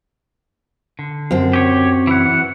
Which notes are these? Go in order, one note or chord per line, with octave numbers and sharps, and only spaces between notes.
D3
F#2 C4
G4 C#5
E3 F#5